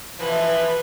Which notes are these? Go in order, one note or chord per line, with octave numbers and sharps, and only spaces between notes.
B2 E3 F3 B4